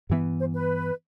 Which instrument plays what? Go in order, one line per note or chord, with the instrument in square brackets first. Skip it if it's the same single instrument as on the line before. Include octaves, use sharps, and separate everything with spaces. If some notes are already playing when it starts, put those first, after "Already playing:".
[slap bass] G2 E3 B3 [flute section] E5
[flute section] C5
B4